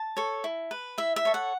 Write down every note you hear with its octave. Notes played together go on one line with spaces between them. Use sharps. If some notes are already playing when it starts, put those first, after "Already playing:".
Already playing: A5
A4 C#5
E4
B4
E4 E5
E5
A4 C#5
F#5